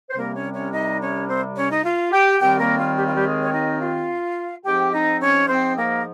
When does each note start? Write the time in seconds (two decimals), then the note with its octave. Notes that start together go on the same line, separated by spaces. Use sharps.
0.10 C5
0.17 C2 C3 G3 A#3 C4 A#4
0.35 C#4 C#5
0.53 C#4 C#5
0.72 D#4 D#5
1.01 C#4 C#5
1.28 C4 C5
1.56 C#4 C#5
1.70 D#4 D#5
1.84 F4 F5
2.12 G4 G5
2.40 D#2 D#3 G3 C4 G4 G5
2.59 A#3 A#4
2.78 F4
2.96 G4
3.06 F4
3.14 G3 G4
3.25 G#3 G#4
3.42 C#5
3.52 D#4 D#5
3.80 F4 F5
4.64 G#2 F3 C4 G4 G5
4.92 D#4 D#5
5.21 C#4 C#5
5.48 C4 C5
5.77 A#3 A#4